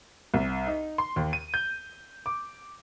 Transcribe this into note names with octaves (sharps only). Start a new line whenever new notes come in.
C2
D#4
C6
D#2
D#7
G6
D6